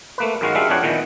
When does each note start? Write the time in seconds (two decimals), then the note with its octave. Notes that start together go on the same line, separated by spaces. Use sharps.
0.18 A3 A#3 B4
0.41 F#2 D#3 G#3 F#4 F5
0.55 G3 G#3 D4 E5 F5
0.70 F2 D4 B4 C#5 F#5 G5
0.83 A#2 D#3 E3 B3